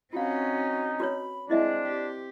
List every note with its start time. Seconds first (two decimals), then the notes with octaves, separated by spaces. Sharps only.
0.13 C4 C#4 D#4 F4 F#4 F5
1.00 F#4 B4 C#5 B5
1.50 G#3 C4 D4 E4 D#5 E5
1.87 G4